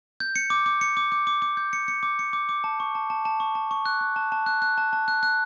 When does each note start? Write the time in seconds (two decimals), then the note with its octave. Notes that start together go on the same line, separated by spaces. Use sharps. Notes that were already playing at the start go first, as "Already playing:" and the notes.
0.20 G6
0.36 C#7
0.50 D6
0.66 D6
0.81 C#7
0.97 D6
1.12 D6
1.27 D6
1.42 D6
1.57 G6
1.73 C#7
1.88 C#7
2.03 D6
2.19 C#7
2.33 D6
2.49 D6
2.64 A5
2.80 C#6
2.95 A5
3.10 A5
3.25 A5
3.40 C#6
3.55 A5
3.71 C#6
3.86 F#6
4.01 F#6
4.16 A5
4.32 A5
4.46 F#6
4.62 F#6
4.78 A5
4.93 A5
5.08 F#6
5.23 F#6